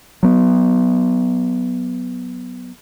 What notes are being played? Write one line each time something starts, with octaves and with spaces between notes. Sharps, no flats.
F#3 B3